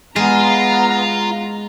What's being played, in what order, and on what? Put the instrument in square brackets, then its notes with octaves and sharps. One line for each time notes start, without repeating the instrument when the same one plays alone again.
[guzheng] G#3 [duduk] B3 [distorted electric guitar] F4 [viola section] A#5